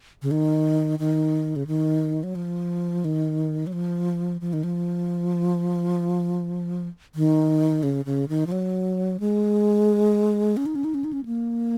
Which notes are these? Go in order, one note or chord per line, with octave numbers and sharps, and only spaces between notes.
C#3
D#3
D#3
C#3
D#3
F#3
F3
D#3
F#3
F3
F3
D#3
F3
D#3
C#3
C#3
D#3
F3
F#3
G#3
C#4
D#4
C#4
D#4
C#4
D#4
C#4
A#3